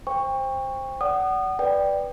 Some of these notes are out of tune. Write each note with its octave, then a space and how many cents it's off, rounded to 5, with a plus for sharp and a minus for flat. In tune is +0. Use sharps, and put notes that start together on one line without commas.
C5 +10 G5 +30 C#6 +0
D5 -25 F#5 +25 D#6 -30
B4 +0 D5 +0 G5 +0